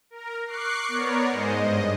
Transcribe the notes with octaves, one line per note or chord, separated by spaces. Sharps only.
A#4
C#6 D6 F#6 C7
B3 A#4 C#5 D5
G#2 G#3 C5 D#5
G2 D#5